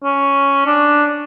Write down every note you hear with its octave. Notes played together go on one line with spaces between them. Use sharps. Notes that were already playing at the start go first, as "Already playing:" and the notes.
C#4
D4